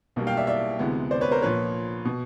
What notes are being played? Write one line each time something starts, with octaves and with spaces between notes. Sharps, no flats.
B1 B2 G3 A#3
F5 G5
D5 E5
D5 E5
D2 C3 E3 G#3 B3
C5 D5
B4 C#5
A#4 C5
A#1 A#2 F3 A#3 B4 C#5
B2